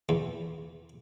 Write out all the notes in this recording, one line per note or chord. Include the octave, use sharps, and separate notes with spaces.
E2